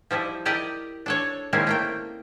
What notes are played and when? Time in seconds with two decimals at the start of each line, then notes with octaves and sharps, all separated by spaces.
0.11 F3 G3 E4 D#5
0.45 E4 G4 A#4 D5 D#5
1.06 D4 A4 C#5
1.53 D#3 G#3 A#3 C4 C#4 E4
1.67 A3 A#3 G5